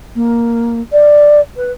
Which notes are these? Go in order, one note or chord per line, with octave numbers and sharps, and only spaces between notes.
A#3
D5
B4